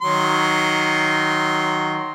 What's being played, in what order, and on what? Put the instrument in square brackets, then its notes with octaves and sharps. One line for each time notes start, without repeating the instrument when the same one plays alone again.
[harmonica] D#3 F#3 C6